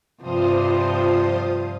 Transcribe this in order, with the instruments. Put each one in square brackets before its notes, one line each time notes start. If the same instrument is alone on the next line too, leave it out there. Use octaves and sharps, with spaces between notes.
[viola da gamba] G2 C3 F3 [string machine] F4 C5 D#6